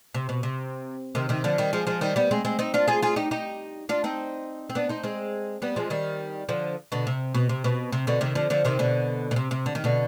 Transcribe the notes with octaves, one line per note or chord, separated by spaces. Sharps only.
C3
B2
C3
C3 D#3
C3 D#3
D3 F3
D#3 G3
F3 G#3
F3 G#3
D#3 G3
G3 B3
G#3 C4
G#3 C4
C4 D#4
D4 F4
F4 G#4
F4 G#4
D#4 G4
D#4 G4
D4 F4
C4 D#4
C4
B3 D4
C4 D#4
G#3 C4
G3 B3
F3 G#3
D#3 G3
D3 F3
B2 D3
C3
B2
C3
B2
C3
B2 D3
C3 D#3
D3 F3
D3 F3
C3 D#3
B2 D3
B2
C3
C3
D3
D#3
B2 D3